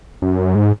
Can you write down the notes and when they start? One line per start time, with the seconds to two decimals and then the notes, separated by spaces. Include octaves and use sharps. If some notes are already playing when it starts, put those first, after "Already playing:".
0.22 F#2
0.55 G#2